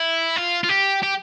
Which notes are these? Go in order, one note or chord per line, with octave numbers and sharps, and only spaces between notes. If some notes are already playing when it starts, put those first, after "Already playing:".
Already playing: E4
F4
F4
G4
G4